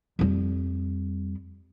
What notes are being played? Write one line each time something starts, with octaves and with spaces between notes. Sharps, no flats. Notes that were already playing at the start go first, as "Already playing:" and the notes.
F2 G3